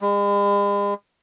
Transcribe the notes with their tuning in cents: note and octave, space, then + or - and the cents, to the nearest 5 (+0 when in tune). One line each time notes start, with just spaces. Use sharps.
G#3 -45